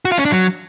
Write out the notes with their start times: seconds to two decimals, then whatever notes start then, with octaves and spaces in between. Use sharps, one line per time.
0.05 F#4
0.12 F4
0.19 C#4
0.25 D4
0.32 F#3